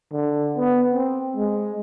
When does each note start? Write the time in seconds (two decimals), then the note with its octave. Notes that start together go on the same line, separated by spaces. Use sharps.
0.12 D3
0.57 B3
0.94 C4
1.37 G#3